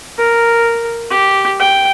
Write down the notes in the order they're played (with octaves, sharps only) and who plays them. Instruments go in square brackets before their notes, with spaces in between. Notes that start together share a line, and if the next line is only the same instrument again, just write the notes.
[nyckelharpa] A#4
G4
G5